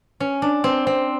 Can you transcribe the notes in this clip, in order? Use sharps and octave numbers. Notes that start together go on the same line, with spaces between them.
C#4
D4
C4
C4